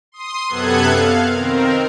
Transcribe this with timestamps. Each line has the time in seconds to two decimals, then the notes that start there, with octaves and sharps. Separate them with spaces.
0.12 C6 D#6
0.48 F#2 C3 B3 A4 F#6 G#6
0.88 F5
1.33 D#3 C4 A#4